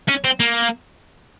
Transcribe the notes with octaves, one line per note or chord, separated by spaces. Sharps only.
C#4
C4
A#3